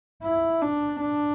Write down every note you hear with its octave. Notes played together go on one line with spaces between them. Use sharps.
E4
D4
D4